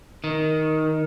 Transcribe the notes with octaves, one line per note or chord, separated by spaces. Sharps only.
D#3